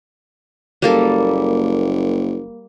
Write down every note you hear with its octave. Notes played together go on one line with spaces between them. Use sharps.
F#1 G3 A#3 A4